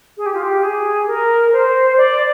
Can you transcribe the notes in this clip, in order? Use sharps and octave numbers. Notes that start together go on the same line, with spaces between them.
G#4
G4
F4
G4
G#4
A#4
C5
D5